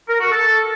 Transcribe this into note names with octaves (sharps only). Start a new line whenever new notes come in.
A#4
F#4
A4